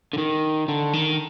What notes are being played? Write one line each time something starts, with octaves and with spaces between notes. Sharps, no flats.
D3
D#3
D3
D#3